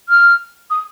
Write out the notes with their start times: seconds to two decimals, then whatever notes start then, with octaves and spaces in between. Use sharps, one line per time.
0.09 F6
0.70 D#6